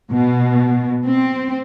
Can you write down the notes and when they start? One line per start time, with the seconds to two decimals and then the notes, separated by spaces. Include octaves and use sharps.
0.12 B2
1.06 C4